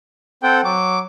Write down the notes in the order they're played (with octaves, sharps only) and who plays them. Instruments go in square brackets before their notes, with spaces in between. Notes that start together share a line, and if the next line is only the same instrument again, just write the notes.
[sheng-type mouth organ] C4 A4 F#5 [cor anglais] G5
[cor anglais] F#3 [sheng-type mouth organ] D6